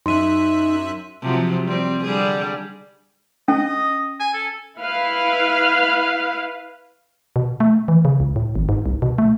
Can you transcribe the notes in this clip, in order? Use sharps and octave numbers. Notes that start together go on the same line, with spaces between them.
F#2 D#4 E5 C6 F#6 D#7
C3 F3 F#3
G3 C4
D3 G3 G#4
C#4 D#5
G#5
A4
E4 B4 F5
B2
A3
E3
C#3
C#2
A2
G#1
G#2
C2
B2
A3